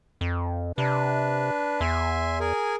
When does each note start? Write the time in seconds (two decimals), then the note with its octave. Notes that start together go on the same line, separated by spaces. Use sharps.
0.21 F2
0.78 C3 D4 B4
1.80 E2 E5 G#5 C6
2.40 G#4 A#4 G#5